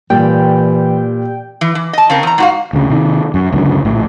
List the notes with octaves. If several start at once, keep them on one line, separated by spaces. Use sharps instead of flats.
A#2 E3 G3 G5
E3
E3
D#5 A5
C#3 C4 A#4
E2 A#5
G#2 F#4 F5
D2 C#3
C3 D#3
F#2
C#2 F#2 D3
A#1 A2